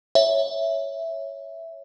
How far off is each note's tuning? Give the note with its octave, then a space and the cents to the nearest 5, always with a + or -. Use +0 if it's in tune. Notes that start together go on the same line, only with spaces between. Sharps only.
C#5 +0 E5 +0